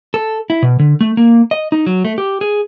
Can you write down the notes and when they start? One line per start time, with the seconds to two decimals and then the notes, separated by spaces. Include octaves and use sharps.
0.14 A4
0.50 E4
0.63 B2
0.79 D3
1.01 A3
1.17 A#3
1.51 D#5
1.72 D#4
1.86 F#3
2.05 A3
2.18 G4
2.41 G#4